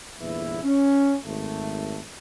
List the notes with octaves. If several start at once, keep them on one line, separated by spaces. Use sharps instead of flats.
G1 E2 A#2 E4 B4 E5
C#4
G#1 A3